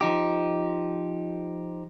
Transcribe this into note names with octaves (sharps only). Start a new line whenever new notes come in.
F3 D#4 G4